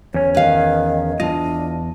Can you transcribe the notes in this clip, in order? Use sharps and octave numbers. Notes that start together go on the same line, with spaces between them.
E2 C#4 C#5
D#3 B4 F5
E2 C#3 D4 F4 D#5